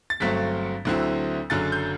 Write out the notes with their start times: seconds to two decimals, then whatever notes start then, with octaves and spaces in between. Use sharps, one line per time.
0.10 A6
0.20 G1 G2 F#3 A3 C4 B6
0.85 D2 D3 F#3 C4 E4
1.50 F#1 F#2 D3 F#3 A6
1.72 G6